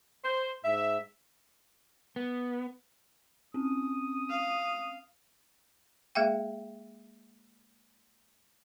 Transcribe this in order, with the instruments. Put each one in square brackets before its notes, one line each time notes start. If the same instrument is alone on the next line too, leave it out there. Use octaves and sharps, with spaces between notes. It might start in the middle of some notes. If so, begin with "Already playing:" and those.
[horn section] C5
G#2 E5
[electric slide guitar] B3
[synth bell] C4 C#4 [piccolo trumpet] D#6
[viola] F5
[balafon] G#3 A#3 G#4 E5 F5 G5